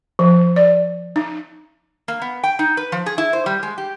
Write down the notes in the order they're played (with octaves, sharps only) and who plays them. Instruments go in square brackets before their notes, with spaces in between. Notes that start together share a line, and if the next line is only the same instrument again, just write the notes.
[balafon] F3
D5
D#4
[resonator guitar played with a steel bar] A#3
B3
G5
D#4
B4
F3
G#4
E4
C5
G3
G#3
G4